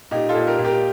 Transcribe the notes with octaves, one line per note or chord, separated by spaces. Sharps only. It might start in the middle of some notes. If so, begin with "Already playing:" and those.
A#2 D#4 G4
F4 A4
A#2
G4 A#4
A#2
G4 A#4